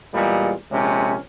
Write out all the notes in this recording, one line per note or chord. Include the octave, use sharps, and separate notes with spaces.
E2 A#2 G3 G#3
A#1 C3 G#3 C#4